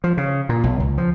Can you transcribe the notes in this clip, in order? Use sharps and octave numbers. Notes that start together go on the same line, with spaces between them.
F3
C#3
A#2
B1
C#2
F3